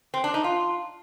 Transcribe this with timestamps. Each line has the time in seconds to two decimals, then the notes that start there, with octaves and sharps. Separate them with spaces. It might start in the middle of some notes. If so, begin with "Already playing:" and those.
0.14 C4
0.24 D4
0.34 D#4
0.44 F4